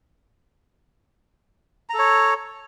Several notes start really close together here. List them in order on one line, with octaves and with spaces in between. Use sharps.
A#5 A4 C#5